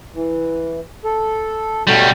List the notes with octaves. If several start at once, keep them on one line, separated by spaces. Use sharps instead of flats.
E3
A4
B2 G3 A3 F#4 C#5